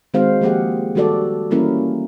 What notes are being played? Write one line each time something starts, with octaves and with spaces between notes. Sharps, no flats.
D#3 G#3 C4 F#4 C5 F5
F3 A#3 G4 G#4 F#5
D#3 G3 F#4 A4 D5
E3 G3 A#3 C#4 E4 A#4